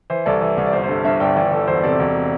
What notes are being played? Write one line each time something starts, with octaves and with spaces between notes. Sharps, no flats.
E3 C5
C2 A4 D5
E3
C2
D5
G1 C5
C5
G2 A4
G2 C5 E5
G1 D5 G5
E3 D5 G5
E3 A4
E1 C5
C3 A4 D5
E1
C3